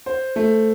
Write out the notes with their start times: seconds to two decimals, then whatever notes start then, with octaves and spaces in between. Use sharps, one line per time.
0.06 C5
0.36 A3